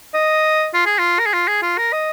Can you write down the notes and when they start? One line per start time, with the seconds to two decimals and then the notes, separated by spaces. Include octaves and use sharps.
0.14 D#5
0.74 F4
0.86 G#4
0.98 F4
1.19 A#4
1.26 G#4
1.33 F4
1.48 G#4
1.62 F4
1.78 A#4
1.92 D#5